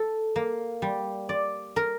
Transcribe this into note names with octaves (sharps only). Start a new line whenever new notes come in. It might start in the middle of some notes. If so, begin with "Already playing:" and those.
Already playing: A4
A#3
G3
D5
A#4